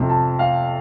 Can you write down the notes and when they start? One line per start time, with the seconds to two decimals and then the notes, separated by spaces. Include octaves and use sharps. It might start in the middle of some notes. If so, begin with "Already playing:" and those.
Already playing: F2 C3 F3
0.10 A5
0.39 F5